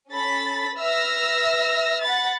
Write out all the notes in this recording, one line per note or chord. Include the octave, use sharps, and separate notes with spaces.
C#4 A4 B5 A6 B6
B4 E5 E6 F6 A#6
F#5 B5 A6